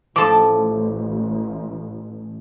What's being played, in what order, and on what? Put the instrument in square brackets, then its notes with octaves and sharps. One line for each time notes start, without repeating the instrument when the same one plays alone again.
[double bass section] A1 [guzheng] F3 A4 [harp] D6